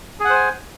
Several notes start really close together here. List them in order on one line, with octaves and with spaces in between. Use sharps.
G#4 F#5 C5 G#5